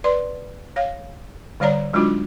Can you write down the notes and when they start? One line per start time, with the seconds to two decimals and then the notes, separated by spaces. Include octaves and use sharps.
0.04 B4 D5 C6
0.76 C#5 F5
1.60 D3 G3 C#5 D5 A#5
1.93 F#3 G#3 D4 D#4 F4 F#4